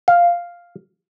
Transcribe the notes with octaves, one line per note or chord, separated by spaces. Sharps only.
F5